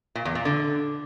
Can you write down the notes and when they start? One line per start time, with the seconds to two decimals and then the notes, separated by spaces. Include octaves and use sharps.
0.15 A#2
0.25 E2
0.35 A#2
0.45 D3